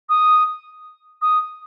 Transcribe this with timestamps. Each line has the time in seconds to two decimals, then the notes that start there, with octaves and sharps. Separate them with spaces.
0.09 D#6
1.22 D#6